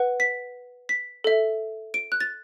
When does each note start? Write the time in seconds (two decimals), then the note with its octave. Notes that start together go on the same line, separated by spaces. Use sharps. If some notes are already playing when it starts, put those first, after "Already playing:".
Already playing: B4 F#5
0.20 B6
0.89 B6
1.24 A4 E5
1.94 D7
2.12 F#6
2.21 A6